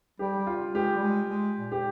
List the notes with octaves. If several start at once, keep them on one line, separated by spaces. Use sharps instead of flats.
G3 G4
G3
F4
G#3 G4
G3
G#3
G#3
A#2
G4